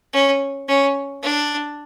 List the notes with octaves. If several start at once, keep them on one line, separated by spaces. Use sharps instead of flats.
C#4
C#4
D4